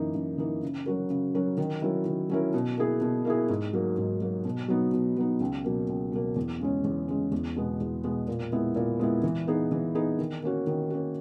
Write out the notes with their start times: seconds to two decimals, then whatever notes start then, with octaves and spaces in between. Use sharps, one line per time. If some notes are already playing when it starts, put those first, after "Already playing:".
Already playing: F#2 E3 A#3 D#4
0.14 F#2
0.38 E3 A#3 D#4
0.63 C#3
0.86 F#3 C#4 F#4 A#4
1.10 C#3
1.34 F#3 C#4 F#4 A#4
1.57 D#3
1.82 F#3 C#4 E4 A#4
2.06 D#3
2.30 F#3 C#4 E4 A#4
2.54 B2
2.77 A#3 E4 G#4
3.01 B2
3.25 A#3 E4 G#4
3.49 G#2
3.73 F#3 A#3
3.98 G#2
4.21 F#3 A#3
4.45 B2
4.68 F#3 B3 D#4
4.93 B2
5.17 F#3 B3 D#4
5.40 C#2
5.64 B2 F#3 A#3
5.89 C#2
6.12 B2 F#3 A#3
6.36 E2
6.60 C#3 G#3 C#4
6.84 E2
7.08 C#3 G#3 C#4
7.32 E2
7.56 B2 G#3 B3
7.80 E2
8.04 B2 G#3 B3
8.28 A#2
8.52 G#3 B3 E4
8.76 A#2
8.99 G#3 B3 E4
9.24 E3
9.47 B3 D#4 G#4
9.72 E3
9.95 B3 D#4 G#4
10.18 D#3
10.43 A#3 C#4 F#4
10.67 D#3
10.90 A#3 C#4 F#4